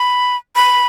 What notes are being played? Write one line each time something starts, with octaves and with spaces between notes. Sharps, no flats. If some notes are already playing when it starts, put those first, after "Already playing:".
Already playing: B5
B5